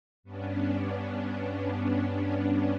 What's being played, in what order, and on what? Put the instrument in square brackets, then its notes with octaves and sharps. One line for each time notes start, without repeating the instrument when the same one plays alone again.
[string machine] G2 B3 C#4 D4